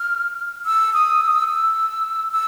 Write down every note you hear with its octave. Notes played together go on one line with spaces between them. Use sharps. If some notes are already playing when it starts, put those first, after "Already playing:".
Already playing: F6
E6
D#6
E6
D#6
E6
E6
E6